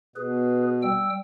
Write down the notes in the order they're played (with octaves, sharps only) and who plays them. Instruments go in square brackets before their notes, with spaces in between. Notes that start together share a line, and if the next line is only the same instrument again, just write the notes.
[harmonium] B2 [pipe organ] G#4 B4
[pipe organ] G3 G5 E6